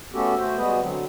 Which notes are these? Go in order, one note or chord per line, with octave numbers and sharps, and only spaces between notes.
A3 B3 C#4 F#4 G4 A4
A3 F#4 C5
G3 G#3 B3 F#4 G#4 B4
D3 F#3 C4